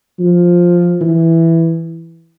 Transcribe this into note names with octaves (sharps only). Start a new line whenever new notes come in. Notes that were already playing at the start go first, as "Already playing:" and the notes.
F3
E3